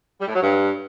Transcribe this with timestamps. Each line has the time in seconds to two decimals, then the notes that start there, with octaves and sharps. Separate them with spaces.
0.21 G3
0.28 A2
0.35 F#3
0.43 G2